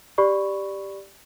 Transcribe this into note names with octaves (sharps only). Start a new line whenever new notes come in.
G4 D5 B5 C#6